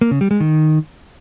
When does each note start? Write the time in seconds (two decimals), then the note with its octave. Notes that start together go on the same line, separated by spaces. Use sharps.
0.01 A#3
0.11 C#3
0.21 G3
0.31 G#3
0.40 D#3